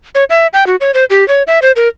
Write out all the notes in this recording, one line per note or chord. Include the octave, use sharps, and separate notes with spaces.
C#5
E5
G5
F#4
C#5
C5
G4
C#5
E5
C5
A#4